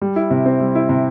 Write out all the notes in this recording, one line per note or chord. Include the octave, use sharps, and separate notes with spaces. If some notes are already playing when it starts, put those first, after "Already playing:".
G3
E4
C3
C4
G3
E4
C3